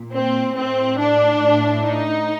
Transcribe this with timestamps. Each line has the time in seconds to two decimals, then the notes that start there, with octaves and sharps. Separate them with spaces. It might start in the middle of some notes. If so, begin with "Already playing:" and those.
Already playing: A#2
0.12 C4
0.55 A2 C4
0.98 D4
1.41 A2
1.83 D#4